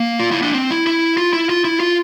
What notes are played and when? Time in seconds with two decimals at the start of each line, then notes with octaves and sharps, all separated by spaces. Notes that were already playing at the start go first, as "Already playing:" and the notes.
Already playing: A#3
0.20 F4
0.32 E4
0.42 D4
0.54 C4
0.71 E4
0.87 E4
1.18 F4
1.33 E4
1.49 F4
1.65 E4
1.80 F4